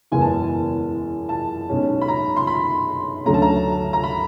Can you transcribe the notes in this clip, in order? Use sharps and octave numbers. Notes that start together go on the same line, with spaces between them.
F#1 E2 B2 G#3 B3 G#5
A5
A5
B1 B2 G#3 C#4
B5
A#5
C6
B5
D2 D3 F#3 A3 C#4 A#5
A5
A#5
A#5
B5